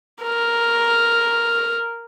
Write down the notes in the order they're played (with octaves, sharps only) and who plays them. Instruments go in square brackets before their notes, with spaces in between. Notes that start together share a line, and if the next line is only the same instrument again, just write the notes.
[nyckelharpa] A#4